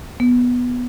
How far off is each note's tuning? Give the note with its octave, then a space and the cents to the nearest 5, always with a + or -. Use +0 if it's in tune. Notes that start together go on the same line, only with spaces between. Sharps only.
B3 -5